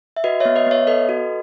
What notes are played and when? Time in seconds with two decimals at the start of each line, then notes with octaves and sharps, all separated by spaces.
0.17 E5
0.24 F#4 B4 D#5
0.40 C#5 E5
0.45 B3
0.56 B4 D#5
0.66 B3 C#5 E5
0.87 A4 B4 D#5
1.09 F#4